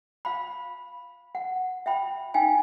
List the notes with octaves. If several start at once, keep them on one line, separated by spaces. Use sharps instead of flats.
F5 B5
F#5
E5 G5 B5
D#4 F5 G5 G#5